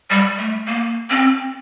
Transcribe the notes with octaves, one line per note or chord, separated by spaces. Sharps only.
G3
A3
A#3
C4